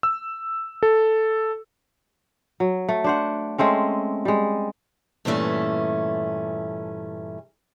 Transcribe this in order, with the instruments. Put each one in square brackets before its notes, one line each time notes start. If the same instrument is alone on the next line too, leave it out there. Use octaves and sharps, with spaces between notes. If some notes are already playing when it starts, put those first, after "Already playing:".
[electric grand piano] E6
A4
[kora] F#3
A3
D4 C5 F#5
G#3 A3 C4 C#4
G3 G#3
[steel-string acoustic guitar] G2 A#2 E3 A3 C#4